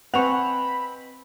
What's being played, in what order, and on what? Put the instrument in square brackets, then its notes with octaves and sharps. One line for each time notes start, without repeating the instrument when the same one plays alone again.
[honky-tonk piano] C4 F7 [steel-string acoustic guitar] B4 D#5 G#5 [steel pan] F#5 C#6 [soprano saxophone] B5